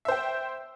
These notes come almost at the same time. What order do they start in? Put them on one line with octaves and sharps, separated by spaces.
E5 C5 G5